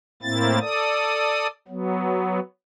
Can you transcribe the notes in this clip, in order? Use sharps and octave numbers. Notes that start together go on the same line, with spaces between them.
A2 A#3 C4 E4 A6
A4 D5 D#6
F#3 B3